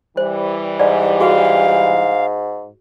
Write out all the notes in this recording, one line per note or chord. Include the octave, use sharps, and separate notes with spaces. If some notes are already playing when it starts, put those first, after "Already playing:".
E3 G3 C5
G#2 D5
F#4 G#4 F5